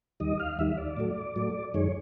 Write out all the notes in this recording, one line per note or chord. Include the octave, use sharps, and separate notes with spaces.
D#2 D#3 G3 D#5
F5
D#2 D#3 G3 E5
D5
A2 F#3 A3
A2 F#3 A3
F#2 D#3 G#3 C#5